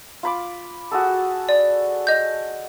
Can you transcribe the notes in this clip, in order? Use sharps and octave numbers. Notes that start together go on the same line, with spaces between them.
F4 B5 D6
F#4 G#4 A4
D5
D#5 G6